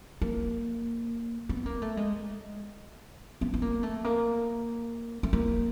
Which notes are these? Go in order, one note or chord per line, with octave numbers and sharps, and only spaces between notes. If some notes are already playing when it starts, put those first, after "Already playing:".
A#3
B3
A#3
A3
G#3
B3
B3
A#3
A3
A#3
A3
A#3